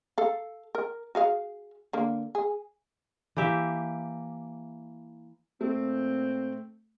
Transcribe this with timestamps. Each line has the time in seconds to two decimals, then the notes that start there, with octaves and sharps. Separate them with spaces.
0.18 A4 F5
0.75 A#4
1.15 F#4 G#4 F5
1.93 D3 A#3
2.35 G#4
3.37 E3 A#3 G4 E5
5.61 A#2 A3 C4